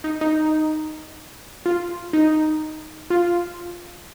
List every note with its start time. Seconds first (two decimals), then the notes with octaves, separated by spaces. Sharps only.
0.04 D#4
0.21 D#4
1.66 F4
2.13 D#4
3.10 F4